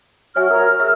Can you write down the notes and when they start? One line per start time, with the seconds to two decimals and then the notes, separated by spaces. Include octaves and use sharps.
0.36 F#4 C#5 E5 G#5 F6
0.51 A#4 C#5 A#5 F6
0.80 G#4 E5 E6 F6